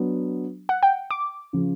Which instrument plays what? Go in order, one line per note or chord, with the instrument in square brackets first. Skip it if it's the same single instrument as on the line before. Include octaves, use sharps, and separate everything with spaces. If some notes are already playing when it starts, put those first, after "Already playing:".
Already playing: [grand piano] F#3 B3 D4
[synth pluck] F#5
G5
D6
[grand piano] C#3 F3